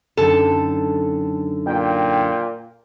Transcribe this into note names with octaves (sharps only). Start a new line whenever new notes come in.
F#2 D3 D#3 A4
A#2 G5